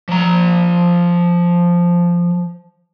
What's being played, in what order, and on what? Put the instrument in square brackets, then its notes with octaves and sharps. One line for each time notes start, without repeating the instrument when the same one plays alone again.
[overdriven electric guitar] F3 A#5